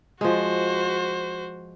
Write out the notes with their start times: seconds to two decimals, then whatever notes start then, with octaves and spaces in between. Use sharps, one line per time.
0.21 F3 G#3 F#4 C5